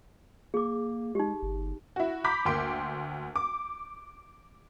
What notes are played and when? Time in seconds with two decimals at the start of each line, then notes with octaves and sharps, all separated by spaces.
0.54 A#3 G#4 D6
1.15 G#3 D#4 G4
1.43 G1
1.96 E4 F#4
2.24 A#5 B5 D6 G6 B6
2.45 D2 A#3 G5 C6 D7
3.36 D6